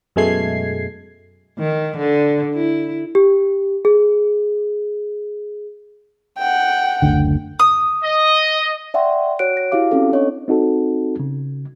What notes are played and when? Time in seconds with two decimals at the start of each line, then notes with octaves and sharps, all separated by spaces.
0.16 F#2 B2 G#3 A3 G#6 C7
1.59 D#3
1.97 D3
2.54 E4
3.15 G4
3.85 G#4
6.38 F#5 G5
7.02 F#1 D2 D3
7.59 D#6
8.03 D#5
8.94 D5 E5 F#5 G5 C6 C#6
9.39 F#4 C#5 F#5 F#6 D7
9.57 A#6
9.72 E4 F#4 G4 F5 D6
9.91 C4 C#4 A4
10.12 D4 C#5 D#5 C#6
10.48 C4 D#4 F#4 A4
11.20 C#3